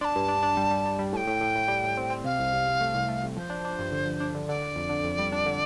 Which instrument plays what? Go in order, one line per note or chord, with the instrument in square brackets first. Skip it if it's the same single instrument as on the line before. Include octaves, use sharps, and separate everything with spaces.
[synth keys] D4 [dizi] C6
[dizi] A5
[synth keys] G2
D4
D4
G3
G3
G3
G3
[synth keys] A2 [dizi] A5
[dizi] G5
[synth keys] A2
A2
A2
G3
A2
C4
C4
[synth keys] C3 [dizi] F5
[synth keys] C2
C2
C2
A3
C2
A3
C2
[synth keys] F3 [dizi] C5
[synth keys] D4
D4
G2
D3
F3
D4
D3
[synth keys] D3 [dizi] D5
[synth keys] D3
F2
D3
F2
G3
D4
D3